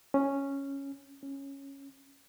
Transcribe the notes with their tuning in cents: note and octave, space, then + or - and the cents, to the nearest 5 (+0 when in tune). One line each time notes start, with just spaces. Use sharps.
C#4 -5
C#4 -10